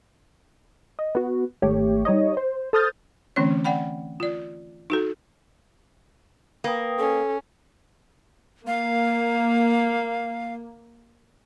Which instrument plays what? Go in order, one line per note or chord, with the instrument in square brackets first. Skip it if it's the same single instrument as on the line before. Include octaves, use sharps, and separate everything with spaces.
[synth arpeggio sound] D#5
B3 F#4
G#1 A3 G4 C#5
G3 D#4 C#5 D#5
C5
A4 C5 D#6 F6 G6 A6
[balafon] D3 E3 A3 C4 C#4 C#5
D5 F#5 G5 B5
F4 D5
D#4 F#4 A4
[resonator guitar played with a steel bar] A#3 [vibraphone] B4 G5 D#6
[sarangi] C#4 [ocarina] A4
[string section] A#3 [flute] F5